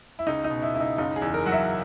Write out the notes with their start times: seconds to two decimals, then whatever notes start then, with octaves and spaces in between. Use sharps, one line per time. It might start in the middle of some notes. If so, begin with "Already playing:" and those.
0.19 E4
0.27 C#2 D#4
0.44 D#4
0.50 B2
0.62 E4
0.74 C#2 E4
0.80 D#4
0.98 F#1 D#4
1.16 G#4
1.22 E2
1.34 A#4
1.46 F#3 F#5
1.52 E5